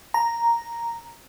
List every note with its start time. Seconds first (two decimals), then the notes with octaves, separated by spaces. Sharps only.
0.14 A#5